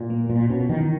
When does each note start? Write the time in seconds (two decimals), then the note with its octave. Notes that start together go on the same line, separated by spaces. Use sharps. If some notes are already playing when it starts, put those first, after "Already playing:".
Already playing: A#2
0.10 A#3
0.29 A#2 A#3
0.50 B2 C#4
0.69 D#3 E3